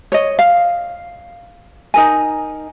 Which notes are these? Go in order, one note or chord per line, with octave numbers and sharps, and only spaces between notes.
C#5 D#5
F5
D#4 A#4 G#5